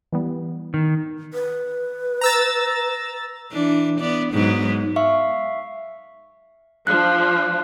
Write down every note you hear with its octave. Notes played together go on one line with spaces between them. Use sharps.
E3 G3 B3
D#3
B4
A#5 E6 A6
E3 D4
B3 D5
G#2 F#3 B3
E5 F5 C#6
F3 D4 F#6